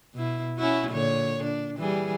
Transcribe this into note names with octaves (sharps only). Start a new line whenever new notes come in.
B2 E4
C#4 E4 F#4
A#2 D3 C#5
D4
E3 G3 G#4